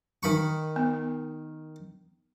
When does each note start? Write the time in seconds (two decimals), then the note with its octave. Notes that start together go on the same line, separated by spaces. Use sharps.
0.23 D#3 B5 C#6
0.76 B3